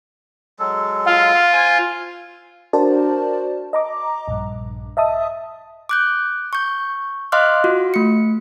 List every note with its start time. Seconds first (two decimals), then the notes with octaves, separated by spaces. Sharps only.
0.59 F#3 G#3 A4
1.06 F4 F5
1.53 C5 G#5
2.73 D4 F#4 A#4 C5 D5 A5
3.73 D#5 A#5 D6
4.28 A#1 G2
4.97 D#5 E5 A5 D#6
5.89 D6 F#6 G6
6.53 C#6 G6
7.32 D#5 F5 C6 D6 F6 F#6
7.64 F4 F#4
7.94 A3 C#7